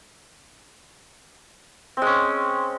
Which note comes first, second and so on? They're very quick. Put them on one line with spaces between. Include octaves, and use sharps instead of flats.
C4 G#3 C#4